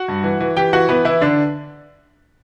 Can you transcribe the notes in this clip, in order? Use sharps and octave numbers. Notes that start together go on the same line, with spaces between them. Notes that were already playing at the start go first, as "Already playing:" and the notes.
Already playing: F#4 F#5
G2
E3
E3
E3 G4 G5
E3 F#4 F#5
E3 B3 B4
E3 E4
D3 D4